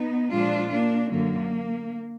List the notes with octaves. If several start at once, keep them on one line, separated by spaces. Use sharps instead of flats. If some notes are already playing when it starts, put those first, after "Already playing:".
Already playing: B3 D#4
A#2 F3 G#3 D4 F4
A#3 D4
F#2 D3 F#3 A#3